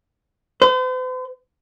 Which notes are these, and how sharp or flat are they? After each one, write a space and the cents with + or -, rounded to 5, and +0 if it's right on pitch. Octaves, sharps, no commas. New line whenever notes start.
C5 -45